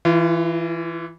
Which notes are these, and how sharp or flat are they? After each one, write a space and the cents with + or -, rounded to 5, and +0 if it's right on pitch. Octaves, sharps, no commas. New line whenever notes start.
E3 +0 F4 -35